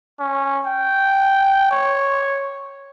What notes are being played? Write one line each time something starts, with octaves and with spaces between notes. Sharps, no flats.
C#4
G5
C#5